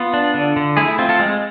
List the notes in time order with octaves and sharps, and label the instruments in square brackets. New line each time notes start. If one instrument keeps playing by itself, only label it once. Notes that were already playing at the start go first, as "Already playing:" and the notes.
Already playing: [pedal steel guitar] B3 F4
D4
D3
D3
A3 E4 G#4
E4
C4 F4
F4 A4
G#3